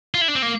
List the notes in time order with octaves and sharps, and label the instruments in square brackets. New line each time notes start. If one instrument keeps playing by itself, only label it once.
[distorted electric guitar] F4
E4
D4
C4
A#3